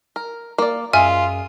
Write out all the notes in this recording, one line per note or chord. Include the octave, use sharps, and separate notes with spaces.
A#4
A#3 D5 D6
F#2 G#3 F4 G#4 E5 G#5 F6